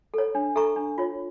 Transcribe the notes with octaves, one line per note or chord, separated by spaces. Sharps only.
A4 C#5
D4
A4 E5 A#5 C#6
D4
F4 C#5